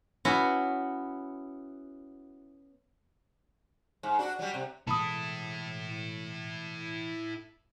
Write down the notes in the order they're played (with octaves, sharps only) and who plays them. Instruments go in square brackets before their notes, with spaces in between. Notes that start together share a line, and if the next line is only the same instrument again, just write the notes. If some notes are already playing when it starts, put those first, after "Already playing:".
[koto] B3 C#4 E4 F#4
[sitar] G#2
D4 F#4
F#3 G3
C3
[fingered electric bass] B2 E3 G#3 [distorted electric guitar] E4 A4 [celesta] A5 B5 D#6